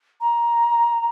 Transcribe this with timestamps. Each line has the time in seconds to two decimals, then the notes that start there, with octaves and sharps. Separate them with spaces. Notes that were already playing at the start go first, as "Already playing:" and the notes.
0.21 A#5